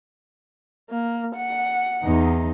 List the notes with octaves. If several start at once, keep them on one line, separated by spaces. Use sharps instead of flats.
A#3
F#5
E2 D#4